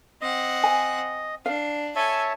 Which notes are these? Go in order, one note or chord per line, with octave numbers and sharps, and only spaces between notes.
C4 D#5 F#5
G#5
D4 F5
A4 C#5 E5 G#5 A5